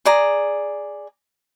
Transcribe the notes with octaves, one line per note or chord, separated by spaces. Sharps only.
G#4 D5 A#5